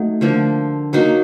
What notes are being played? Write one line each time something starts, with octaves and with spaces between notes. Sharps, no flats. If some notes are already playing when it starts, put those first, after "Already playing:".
Already playing: F#3 A3 D#4
D3 F3 A#3
F#3 A#3 D#4 F#4